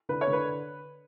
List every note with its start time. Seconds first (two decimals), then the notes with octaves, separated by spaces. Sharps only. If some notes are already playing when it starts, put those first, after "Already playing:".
0.09 D3 B4
0.21 C#5
0.27 D3
0.33 B4